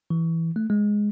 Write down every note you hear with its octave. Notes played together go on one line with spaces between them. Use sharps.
E3
A3
G#3